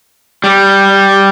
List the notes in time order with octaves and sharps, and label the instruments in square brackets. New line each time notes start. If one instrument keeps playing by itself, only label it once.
[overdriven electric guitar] G3